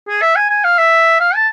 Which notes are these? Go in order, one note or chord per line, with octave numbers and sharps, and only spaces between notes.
G#4
E5
G#5
G#5
F5
E5
F5
A5